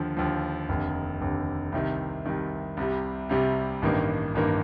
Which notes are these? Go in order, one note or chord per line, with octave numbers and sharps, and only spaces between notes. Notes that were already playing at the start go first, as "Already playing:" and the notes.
Already playing: D#2 D3 F3
D#2 D3 F3
F1 D#2 D3
F1 D#2 D3
C2 C3 D#3
C2 C3 D#3
C2 C3 G3
C2 C3 G3
A1 G2 D#3 A#3
A1 G2 D#3 A#3